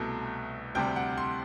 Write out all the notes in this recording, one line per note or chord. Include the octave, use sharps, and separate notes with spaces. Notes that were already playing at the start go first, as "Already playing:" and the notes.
Already playing: C2 B2 A3
D2 C3 G3 G5
F#5
C6